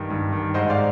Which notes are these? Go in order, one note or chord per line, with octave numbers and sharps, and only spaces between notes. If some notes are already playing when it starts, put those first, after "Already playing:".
Already playing: G2 D#3
G2
D#3
G#2 C5 D#5
D5 F5